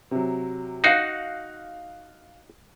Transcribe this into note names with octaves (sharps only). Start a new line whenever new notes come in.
C3 F#3
D#4 F#4 F5 F#6 C7